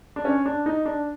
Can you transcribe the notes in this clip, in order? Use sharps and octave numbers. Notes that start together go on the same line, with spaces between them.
D4
C#4
D4
D#4
D4